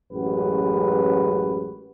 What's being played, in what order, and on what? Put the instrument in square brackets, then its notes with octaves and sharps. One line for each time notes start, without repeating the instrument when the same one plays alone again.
[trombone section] A1 F#2 G#3 F#4 G4 B4